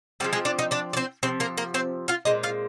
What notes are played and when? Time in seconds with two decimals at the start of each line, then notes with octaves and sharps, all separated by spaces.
0.20 F3 G3 G#3 C4 G4
0.33 G#3 G#4
0.45 D4 D5
0.59 D#4 D#5
0.71 D4 D5
0.93 D5
0.97 C4 C5
1.23 C3 F3 C4 C5
1.40 A#3 A#4
1.57 A#3 A#4
1.74 C4 C5
2.08 F4 F5
2.25 A#2 G#3 C4 D#5
2.43 F4 F5